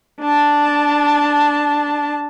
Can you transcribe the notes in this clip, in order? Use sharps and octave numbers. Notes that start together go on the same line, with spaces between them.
D4 A5